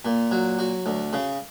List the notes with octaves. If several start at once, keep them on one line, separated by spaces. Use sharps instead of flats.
A#2
F#3
F#4
D2
C#3